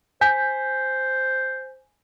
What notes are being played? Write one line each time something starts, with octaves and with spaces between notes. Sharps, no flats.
C5 G#5 G6 B6